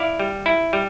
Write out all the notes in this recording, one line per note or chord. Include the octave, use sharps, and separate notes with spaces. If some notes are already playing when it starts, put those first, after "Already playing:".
Already playing: E4 D5 F5
G3
E4
G3